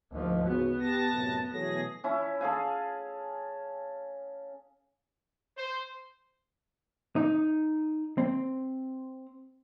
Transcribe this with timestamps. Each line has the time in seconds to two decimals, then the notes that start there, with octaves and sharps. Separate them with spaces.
0.12 D2 G#2 F3 A#3 D#5
0.47 G#2 C#3 B3 F#4
0.80 G4 A5 A#6
1.12 F#2 A2 C3
1.52 B2 E3 F#3 A3 G#4 A#6
2.04 C#4 E4
2.41 G#4 A4 F5 G#5
5.56 C5
7.16 D#4
8.18 C4